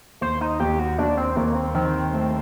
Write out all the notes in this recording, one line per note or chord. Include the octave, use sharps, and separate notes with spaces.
D#2 C5
D#4
D#2 G4
F#4
D#2 D4
C4
D#2 A#3
C4
D#3 C4
A3